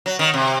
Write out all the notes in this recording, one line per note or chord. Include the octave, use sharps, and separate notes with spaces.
F#3
D#3
C3